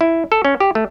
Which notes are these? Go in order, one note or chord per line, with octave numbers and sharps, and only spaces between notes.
E4
A4
C#4
G4
A3